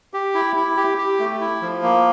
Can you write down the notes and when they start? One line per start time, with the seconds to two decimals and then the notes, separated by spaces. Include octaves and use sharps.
0.14 G4
0.35 E4
0.56 E4
0.77 G4
0.98 G4
1.19 A3
1.41 E4
1.61 F3
1.83 A#3